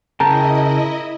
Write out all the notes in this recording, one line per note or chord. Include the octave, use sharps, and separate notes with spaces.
C#3 E4 A#4 D#5 G5 A5 A#5